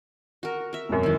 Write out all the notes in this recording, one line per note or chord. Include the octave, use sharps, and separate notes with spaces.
F#4 A#4
A#4 E5
E1 F#2
D#3 E3